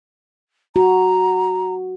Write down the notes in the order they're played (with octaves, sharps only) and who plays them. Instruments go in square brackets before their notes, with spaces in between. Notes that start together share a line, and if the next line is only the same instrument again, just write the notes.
[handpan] F#4 [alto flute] A#5